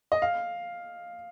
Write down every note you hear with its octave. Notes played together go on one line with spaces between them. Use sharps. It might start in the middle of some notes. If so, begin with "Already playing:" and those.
D#5
F5